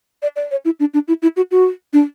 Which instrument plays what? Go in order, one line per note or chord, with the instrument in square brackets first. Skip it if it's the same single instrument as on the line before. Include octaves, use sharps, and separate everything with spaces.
[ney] D5
D5
C#5
E4
D4
D4
E4
E4
F#4
F#4
D4